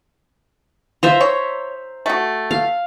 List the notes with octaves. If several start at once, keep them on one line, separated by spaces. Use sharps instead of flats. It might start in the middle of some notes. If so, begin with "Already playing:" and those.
F4 C5 E5 A#5
C#5
A3 F#4
F5